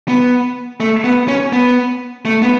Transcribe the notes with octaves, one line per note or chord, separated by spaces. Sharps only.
B3
A3
B3
C#4
B3
A3
B3